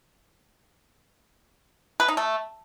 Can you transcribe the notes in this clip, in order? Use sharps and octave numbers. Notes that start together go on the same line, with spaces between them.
B4
D#4
A3